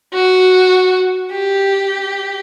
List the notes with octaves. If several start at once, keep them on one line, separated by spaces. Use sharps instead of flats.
F#4
G4